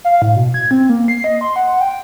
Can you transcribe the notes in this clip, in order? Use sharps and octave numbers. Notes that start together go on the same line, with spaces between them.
F5
A2
B2
G#6
C4
A#3
C7
D#5
C6
F#5
G5